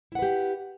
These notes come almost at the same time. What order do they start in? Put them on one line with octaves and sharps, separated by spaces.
E4 F#5 B4 G4